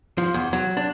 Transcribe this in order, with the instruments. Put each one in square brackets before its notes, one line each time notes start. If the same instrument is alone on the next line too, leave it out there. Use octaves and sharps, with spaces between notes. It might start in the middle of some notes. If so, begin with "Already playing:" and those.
[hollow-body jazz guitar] F3
E2
F#3
D4